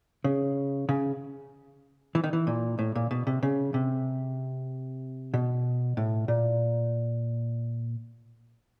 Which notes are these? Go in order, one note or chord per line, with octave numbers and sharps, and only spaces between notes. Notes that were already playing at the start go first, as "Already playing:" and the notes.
C#3
C#3
E3
D#3
E3
A#2
A2
A#2
B2
C3
C#3
C3
B2
A2
A#2